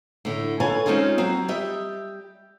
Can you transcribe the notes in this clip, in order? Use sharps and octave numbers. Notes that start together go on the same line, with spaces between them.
A2 D3
A4 B4 C#5 F5 G#5 A5
G#3 C4 C#4 D#4 F4 G#4
F#3 C4
G3 G4 D#5 E5